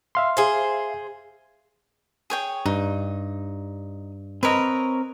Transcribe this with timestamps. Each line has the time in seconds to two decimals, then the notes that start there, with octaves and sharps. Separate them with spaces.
0.15 E5 F5 C6
0.37 G#4 C5
2.30 G#4 C#5 G5
2.66 G2 D#4
4.43 C4 A#4 B4 C#5 D#5